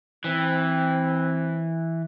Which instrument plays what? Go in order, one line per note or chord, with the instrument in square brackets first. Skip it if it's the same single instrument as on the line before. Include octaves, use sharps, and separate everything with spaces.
[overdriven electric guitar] E3 [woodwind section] C4